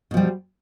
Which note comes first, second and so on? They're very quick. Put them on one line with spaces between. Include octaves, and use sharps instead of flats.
B2 F3 G3